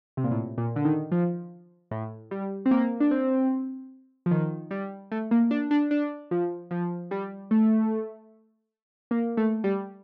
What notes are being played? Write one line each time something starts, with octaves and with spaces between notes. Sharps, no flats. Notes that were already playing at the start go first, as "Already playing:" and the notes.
C3
A#2
A2
A#2
D3
D#3
F3
A2
G3
C4
A#3
D4
C4
F3
D#3
G3
A3
A#3
D4
D4
D4
F3
F3
G3
A3
A#3
A3
G3